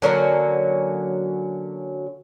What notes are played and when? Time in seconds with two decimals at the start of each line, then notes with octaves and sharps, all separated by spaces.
0.02 D3 F#3 A#3 C#4